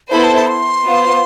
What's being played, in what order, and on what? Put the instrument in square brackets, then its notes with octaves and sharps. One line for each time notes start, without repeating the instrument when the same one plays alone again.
[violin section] B3 E4 A4 C5 [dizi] B5
[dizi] A5
A5
C6
[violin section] B3 F4 C5